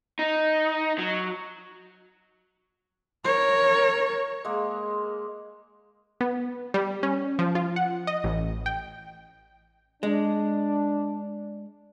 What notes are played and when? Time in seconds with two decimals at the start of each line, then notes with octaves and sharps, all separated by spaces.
0.19 D#4
0.98 F#3
3.25 A#4 C#5
4.44 G#3 A#3
6.21 B3
6.74 G3
7.03 C#4
7.39 F3
7.55 F4
7.76 F#5
8.07 D#5
8.24 A1
8.66 G5
10.03 G#3 D4